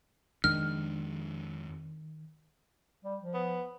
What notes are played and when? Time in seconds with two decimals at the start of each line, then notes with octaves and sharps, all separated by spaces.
0.44 F2 D#3 G#3 D4 F6
3.05 G3
3.21 F3
3.34 B3